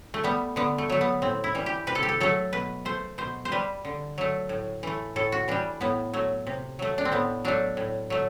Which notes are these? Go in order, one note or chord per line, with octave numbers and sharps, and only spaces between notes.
A3
G3 B3
D3 B3
A3
F#3 A3
B3
A2 C4
E4
E3 G3
G4
C3 B4
A4
G4
A4
F#3 A3 A4
B2 B4
A3 C5
B2 C5
C5
G3 B4
D3
F#3 A3
A2
E3 A3
A2 A4
F#4
E3 G3 D4
A2 B3
F#3 A3
C3
F#3 A3
D4
C4
A2 B3
F#3 A3 D4
A2
F#3 A3